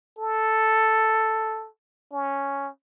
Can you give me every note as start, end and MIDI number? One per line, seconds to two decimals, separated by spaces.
0.18 1.68 69
2.13 2.69 61